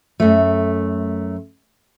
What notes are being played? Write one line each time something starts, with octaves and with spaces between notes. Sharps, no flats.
F#2 A3